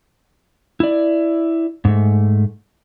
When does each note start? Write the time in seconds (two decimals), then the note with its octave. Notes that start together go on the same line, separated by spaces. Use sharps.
0.80 E4 D5
1.85 G#2 A3